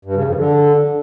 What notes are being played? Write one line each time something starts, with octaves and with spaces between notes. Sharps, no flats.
G2
C#3
F2
D3